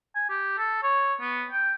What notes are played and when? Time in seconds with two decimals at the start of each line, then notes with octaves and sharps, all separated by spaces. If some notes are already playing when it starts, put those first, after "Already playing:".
0.16 G#5
0.30 G4
0.58 A4
0.83 C#5
1.21 B3
1.52 G5